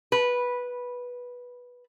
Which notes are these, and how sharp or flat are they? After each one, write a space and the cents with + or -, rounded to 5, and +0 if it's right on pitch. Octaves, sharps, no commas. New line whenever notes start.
B4 -10